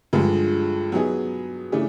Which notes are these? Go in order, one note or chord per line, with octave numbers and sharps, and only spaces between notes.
G2 D3 F3 G#3
F#3 B3 D#4 G#4
C#3 E3 A3 D4